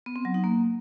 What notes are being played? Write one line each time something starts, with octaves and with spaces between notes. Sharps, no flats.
B3
C4
F#3
D#4
A#3